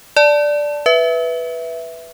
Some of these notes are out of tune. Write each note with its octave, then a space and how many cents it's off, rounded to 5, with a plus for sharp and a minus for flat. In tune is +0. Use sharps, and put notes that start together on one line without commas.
D5 +0 A5 +0
B4 +0 E5 +0